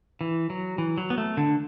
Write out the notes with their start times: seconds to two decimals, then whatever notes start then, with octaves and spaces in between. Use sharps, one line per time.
0.21 E3
0.50 F#3
0.78 E3
0.98 F#3
1.10 B3
1.18 A3
1.37 D3